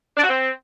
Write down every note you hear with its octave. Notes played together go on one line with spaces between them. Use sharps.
D4
F#4
C4